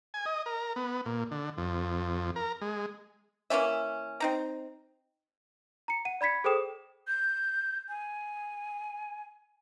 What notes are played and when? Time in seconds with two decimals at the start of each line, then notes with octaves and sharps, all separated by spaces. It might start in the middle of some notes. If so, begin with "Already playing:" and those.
0.14 G#5
0.26 D#5
0.46 A#4
0.76 B3
1.06 A#2
1.31 D3
1.57 F2
2.36 A#4
2.61 G#3
3.50 E3 A#3 C#4 E5
4.20 C4 D#4 A#5
5.88 A#5 C#7
6.05 F#5 D#7
6.21 D5 B5 G#6 B6 C#7
6.44 G#4 A4 C5 G5 D#6 E7
7.08 G6
7.89 G#5